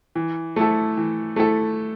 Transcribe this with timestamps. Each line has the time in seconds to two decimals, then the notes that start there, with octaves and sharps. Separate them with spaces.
0.15 E3
0.56 A3 E4 A4
0.97 E3
1.36 A3 E4 A4